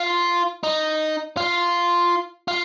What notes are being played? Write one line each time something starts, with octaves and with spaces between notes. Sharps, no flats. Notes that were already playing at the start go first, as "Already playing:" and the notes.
Already playing: F4
D#4
F4
F4